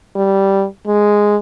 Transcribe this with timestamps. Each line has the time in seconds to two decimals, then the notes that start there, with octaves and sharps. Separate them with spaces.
0.16 G3
0.87 G#3